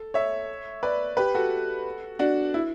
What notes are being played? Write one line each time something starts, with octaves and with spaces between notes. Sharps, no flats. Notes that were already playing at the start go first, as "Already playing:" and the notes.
Already playing: A4
C#5 E5
B4 D5
G4 B4
F#4 A4
D4 F#4
E4